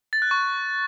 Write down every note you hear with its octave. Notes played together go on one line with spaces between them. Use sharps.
A6
F#6
C#6